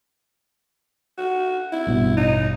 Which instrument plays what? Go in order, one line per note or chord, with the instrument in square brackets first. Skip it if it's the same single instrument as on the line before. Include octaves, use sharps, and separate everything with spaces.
[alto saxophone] F#4
E4
[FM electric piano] A1 G2 B2
[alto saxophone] D#4